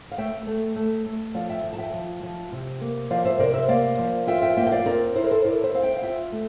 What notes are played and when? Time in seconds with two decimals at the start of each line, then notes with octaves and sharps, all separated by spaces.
0.12 F5
0.18 A3 E5 G5
0.47 A3
0.76 A3
1.06 A3
1.34 F3 D5 F5
1.49 E5 G5
1.64 F3
1.73 A5
1.78 E5 G5
1.93 F3
2.23 F3
2.52 C3
2.81 A#3
3.10 F3 D5 F5
3.25 C5 E5
3.39 C3 A#4 D5
3.54 C5 E5
3.68 A#3 D5 F5
3.99 F3
4.27 F4 E5 G5
4.42 E5 G5
4.57 A#3 E5 G5
4.67 G5
4.71 D5 F5
4.86 C4 A#4 D5
5.16 E4 C5
5.24 A#4
5.31 A4 C5
5.45 E4 A#4 D5
5.63 C5 E5
5.74 C4 F5
5.83 E5 G5
5.97 F5
6.02 F4 E5 G5
6.32 A3